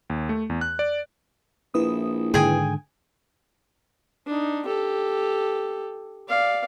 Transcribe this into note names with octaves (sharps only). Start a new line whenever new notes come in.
D#2
A3
E2
F#6
D5
A#1 E4 B4 D#6
G#2 D3 D#3 G#4 G5 G#5
D4 D#4
G4 A4
D5 F5